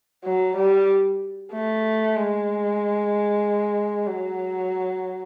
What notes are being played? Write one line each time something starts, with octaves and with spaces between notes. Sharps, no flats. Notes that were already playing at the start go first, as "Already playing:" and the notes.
F#3
G3
A3
G#3
F#3